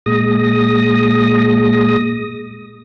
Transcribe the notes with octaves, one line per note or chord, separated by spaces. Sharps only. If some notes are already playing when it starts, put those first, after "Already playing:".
A#2 G#3 D#6 A#6